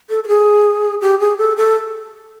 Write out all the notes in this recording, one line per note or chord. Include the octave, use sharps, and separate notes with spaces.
A4
A4
G#4
G4
G#4
A4
A4